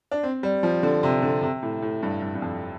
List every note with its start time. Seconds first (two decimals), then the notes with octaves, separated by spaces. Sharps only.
0.11 D4
0.23 C4
0.43 G3
0.63 F3
0.83 D3
1.03 C3
1.22 D3
1.43 C3
1.62 A2
1.82 A2
2.03 G2
2.22 G2
2.35 G2
2.42 F2